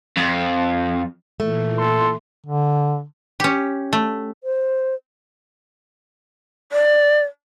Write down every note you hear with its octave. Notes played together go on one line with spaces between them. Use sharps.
F2
A#2 E3 A3
A4 C6
D3
C#4 G4
A3
C5
D5